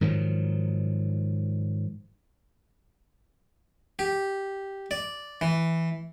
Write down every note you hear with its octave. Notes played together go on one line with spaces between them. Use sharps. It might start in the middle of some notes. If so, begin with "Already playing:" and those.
G#2 D#3 F3 F#3
G4
D5
E3